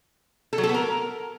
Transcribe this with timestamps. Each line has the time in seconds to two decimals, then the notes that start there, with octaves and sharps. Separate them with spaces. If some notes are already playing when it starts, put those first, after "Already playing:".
0.53 A4
0.58 F#3
0.64 A4
0.69 B3
0.74 A#4